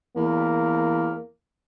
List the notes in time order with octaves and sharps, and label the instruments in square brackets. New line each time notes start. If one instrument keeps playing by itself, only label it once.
[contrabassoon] E2 [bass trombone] A#3